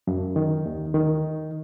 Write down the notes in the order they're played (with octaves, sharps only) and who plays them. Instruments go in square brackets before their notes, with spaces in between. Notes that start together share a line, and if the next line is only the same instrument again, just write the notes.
[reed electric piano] F#2
D#3
D#2
D#3